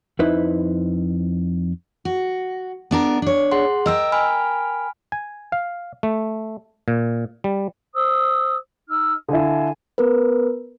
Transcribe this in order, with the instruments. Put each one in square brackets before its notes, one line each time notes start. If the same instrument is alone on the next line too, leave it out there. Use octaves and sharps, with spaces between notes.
[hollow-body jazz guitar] F2 D#4 E4 B4 C5
[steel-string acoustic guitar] F#4
B3 D4 A#4
D4 C#5
[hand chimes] G#4 F#5 C6
[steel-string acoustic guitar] A#4 G5 [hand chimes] D#5 E6
[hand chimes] G#5 B5 F6
[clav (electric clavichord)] G#5
F5
A3
A#2
G3
[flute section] C5 D#6 E6
D#4 E6 F6
[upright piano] D3 E4 [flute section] F5 G#5 A5
[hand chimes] B3 A#4 B4